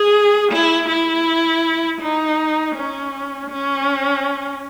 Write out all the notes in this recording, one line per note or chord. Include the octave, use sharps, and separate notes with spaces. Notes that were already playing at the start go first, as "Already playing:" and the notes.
Already playing: G#4
E4
E4
D#4
C#4
C#4